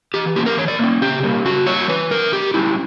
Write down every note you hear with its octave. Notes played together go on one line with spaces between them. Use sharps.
E3 G4
A#3 C#4 G4
A#4
E3 C#5
D5
A#3 C#4
C#3 G4
G3 A#3 C#4
C#3 F#4
G3 A#3 C#4 C#5
E3 B4
G3 C#4 A#4
E3 G4
G3 C#4 E4